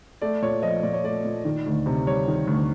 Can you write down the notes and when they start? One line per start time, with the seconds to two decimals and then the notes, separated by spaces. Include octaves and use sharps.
0.22 A3 D5
0.42 A#2 C#5
0.62 F3 D#5
0.83 A#2 D5
0.93 C#5
1.03 A3 D5
1.25 A#2
1.45 D#3
1.66 D2
1.86 C3
2.06 G3 C#5
2.28 D#3
2.47 D2